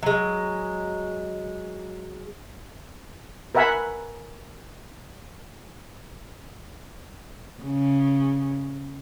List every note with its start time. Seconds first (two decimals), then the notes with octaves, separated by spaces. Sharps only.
0.03 F#3 G#3
3.55 A#4 B4 E5 F#5 G#5 B5
7.63 C#3